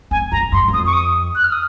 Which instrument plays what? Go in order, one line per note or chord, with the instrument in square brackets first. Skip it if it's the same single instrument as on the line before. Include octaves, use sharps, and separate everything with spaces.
[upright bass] F2 [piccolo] G#5
[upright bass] F2 [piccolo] A#5
[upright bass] F#2 [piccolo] C6
[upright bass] F#2
[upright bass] F2 [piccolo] D#6
[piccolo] C#6
D#6
F#6
F6
D#6